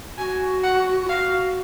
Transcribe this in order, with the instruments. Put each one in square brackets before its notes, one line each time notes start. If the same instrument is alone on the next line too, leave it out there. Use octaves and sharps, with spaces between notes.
[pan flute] F#4 [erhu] G#5
[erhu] F#5
[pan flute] F4
[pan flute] F#4 [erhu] F5